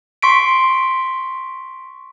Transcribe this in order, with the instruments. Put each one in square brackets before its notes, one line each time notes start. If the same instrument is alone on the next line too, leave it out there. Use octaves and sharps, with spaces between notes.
[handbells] C6 C#6 B6 D7